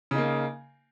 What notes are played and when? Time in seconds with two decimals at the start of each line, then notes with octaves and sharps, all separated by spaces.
0.11 C#3
0.14 D#4
0.18 A#3